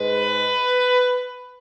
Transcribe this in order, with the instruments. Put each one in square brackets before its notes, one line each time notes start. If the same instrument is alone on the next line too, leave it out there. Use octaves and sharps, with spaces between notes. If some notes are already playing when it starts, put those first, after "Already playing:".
Already playing: [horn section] G#2 G#3 B4